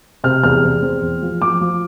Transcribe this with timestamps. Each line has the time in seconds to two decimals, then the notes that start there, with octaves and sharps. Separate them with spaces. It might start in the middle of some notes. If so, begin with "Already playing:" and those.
0.24 C3 F6
0.44 E2 F6
0.64 E2
0.82 C4
1.02 E2
1.22 F3
1.41 F3 D6
1.61 F3